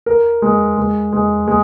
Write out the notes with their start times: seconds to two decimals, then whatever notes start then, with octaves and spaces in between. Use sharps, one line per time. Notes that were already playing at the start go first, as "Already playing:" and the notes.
0.06 A#4
0.42 G#3
0.77 G#3
1.12 G#3
1.47 G#3